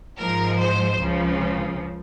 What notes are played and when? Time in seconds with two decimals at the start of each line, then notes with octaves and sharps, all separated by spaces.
0.19 G#2 F3 G#3 A#4
0.59 C5
0.98 C#2 C#3 F3